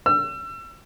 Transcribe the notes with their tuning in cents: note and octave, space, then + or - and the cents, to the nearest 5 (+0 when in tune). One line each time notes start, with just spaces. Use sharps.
E6 +35